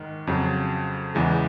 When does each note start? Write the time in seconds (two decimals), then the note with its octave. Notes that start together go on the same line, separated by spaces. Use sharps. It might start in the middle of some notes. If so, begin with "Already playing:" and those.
Already playing: G#2 D#3 G#3
0.27 F2 C#3 F#3
1.15 E2 C#3 E3 G#3